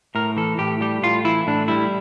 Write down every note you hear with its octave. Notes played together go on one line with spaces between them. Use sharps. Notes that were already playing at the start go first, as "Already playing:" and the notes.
A2 A#4
E3 A4
A2 G4
G3 G4
A2 F4
E3 E4
A2 D4
G3 E4